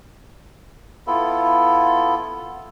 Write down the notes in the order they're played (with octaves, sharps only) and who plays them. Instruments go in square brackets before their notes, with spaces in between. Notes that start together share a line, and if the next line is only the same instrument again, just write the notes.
[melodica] B3 E4 F4 A4